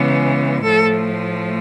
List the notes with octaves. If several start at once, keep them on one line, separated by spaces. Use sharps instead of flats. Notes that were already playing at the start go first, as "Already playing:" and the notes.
Already playing: C#3 E3 G#3 B3
A2 F3 A3 A4